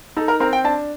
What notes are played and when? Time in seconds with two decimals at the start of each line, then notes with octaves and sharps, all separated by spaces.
0.17 D#4 A4
0.28 A#4
0.40 C4 A#4
0.53 G5
0.64 D4 A5